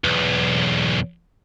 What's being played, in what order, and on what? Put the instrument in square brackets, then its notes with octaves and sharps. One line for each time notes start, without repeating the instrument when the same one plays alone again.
[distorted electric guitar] B1 E2